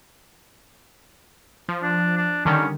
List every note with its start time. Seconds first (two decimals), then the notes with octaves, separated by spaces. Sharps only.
1.69 F3
1.83 D4
2.17 D4
2.45 D3 D#3 G3 C#4